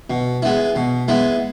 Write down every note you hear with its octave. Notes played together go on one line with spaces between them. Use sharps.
B2
G#3 B3 E4
B2
G#3 B3 E4